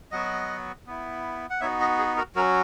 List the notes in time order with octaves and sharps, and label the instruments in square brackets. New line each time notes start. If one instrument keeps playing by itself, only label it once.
[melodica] F#3 B3 F#4 D#5 F#5
B3 E4
F#5
B3 D#4 F#4 C#5 E5
B4 D#5
G#4
F#4 A#4
F#3 C#4 F#4 A#4